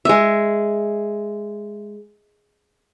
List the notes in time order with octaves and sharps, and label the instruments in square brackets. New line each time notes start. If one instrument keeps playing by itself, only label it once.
[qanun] G#3 E5